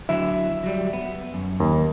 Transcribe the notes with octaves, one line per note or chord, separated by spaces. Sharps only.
D3 F#3 E4 E5
F#3 G3
B3
F#2
D#2